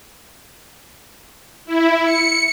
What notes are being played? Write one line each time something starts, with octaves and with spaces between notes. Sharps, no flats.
E4
C#7